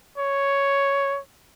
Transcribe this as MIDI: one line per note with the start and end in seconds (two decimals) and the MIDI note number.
0.18 1.19 73